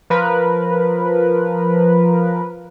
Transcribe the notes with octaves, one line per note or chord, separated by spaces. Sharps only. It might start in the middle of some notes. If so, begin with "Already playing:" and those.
F3 A#4 B4